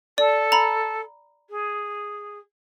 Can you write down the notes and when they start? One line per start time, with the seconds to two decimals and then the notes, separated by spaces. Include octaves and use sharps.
0.18 A4 D5
0.52 A#5 B5
1.49 G#4